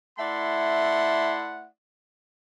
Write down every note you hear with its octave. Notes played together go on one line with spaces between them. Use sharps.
A3 E4 D5 E5 F#5 C6